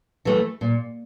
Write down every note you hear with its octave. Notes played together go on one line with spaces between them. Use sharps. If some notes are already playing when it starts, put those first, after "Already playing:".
E3 A3
A#2